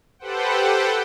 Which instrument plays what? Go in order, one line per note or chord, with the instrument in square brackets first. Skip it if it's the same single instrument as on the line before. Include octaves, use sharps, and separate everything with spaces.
[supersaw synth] G4 A4 B4 C5 F#5 G5